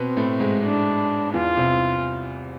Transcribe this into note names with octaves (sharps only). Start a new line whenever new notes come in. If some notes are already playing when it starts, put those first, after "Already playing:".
Already playing: B2 B3 C4
A2 A3
G#2 G#3
D4
E2 E3 F4
C2 C3